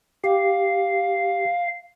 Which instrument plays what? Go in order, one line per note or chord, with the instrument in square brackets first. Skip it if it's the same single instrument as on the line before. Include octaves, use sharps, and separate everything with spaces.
[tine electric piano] G4 [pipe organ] F5